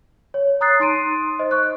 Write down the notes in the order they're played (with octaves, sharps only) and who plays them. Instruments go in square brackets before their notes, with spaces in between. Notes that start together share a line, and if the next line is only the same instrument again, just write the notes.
[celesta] C#5
A#5 D#6 F#6 A6 C7
D#4 C6 D7 D#7
C5 D#5
C#6 F#6